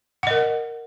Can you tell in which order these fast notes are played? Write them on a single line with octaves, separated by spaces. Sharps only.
F#5 D#5 A#4